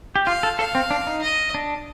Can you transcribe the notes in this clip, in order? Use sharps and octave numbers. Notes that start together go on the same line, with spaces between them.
G4
F4 F5
A4
A4 F5
C4
D4
D#4
D#5
D4